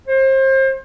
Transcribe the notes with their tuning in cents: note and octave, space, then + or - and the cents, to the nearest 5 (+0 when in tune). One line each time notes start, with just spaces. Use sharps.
C5 +30